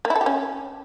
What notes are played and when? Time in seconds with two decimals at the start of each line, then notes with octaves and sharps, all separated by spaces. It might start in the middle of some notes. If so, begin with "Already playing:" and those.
0.05 A#3
0.10 E4
0.16 A4
0.21 G4
0.26 C#4